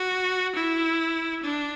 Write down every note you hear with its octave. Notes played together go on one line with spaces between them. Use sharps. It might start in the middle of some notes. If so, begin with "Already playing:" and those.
Already playing: F#4
E4
D4